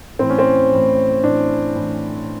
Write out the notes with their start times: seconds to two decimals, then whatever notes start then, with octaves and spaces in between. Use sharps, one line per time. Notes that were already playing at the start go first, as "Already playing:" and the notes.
0.19 A2 E3 C4
0.30 C#4
0.39 C4
0.71 A2 E3
1.24 A2 E3 D4
1.76 A2 E3